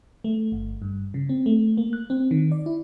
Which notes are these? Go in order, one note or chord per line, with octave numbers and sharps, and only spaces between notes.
A3
G1
G2
C#3
C4
A3
A#3
F#6
C4
D#3
D5
E4